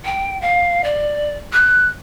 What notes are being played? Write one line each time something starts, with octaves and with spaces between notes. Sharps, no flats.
G5
F5
D5
F#6